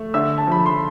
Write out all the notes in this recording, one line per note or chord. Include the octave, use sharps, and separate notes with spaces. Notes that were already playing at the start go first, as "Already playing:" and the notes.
Already playing: A3
D3 E5 E6
A5
F3 B5
C6